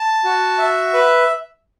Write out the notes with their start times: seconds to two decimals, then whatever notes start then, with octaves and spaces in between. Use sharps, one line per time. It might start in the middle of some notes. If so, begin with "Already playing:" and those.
Already playing: A5
0.24 F#4
0.58 E5
0.93 B4